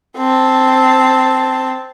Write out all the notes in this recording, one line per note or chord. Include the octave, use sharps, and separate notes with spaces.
C4 A5